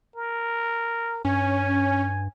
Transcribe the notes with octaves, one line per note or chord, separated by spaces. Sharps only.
A#4
G2 C#4 G#5